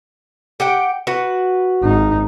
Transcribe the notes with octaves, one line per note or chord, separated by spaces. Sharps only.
G4 F#5 G5
F#4 B4
G#1 D#4